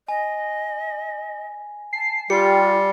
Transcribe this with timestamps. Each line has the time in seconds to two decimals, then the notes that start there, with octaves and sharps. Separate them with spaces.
0.08 D#5 G#5
1.93 A5 C7
2.30 G3 F4 G4 C7 C#7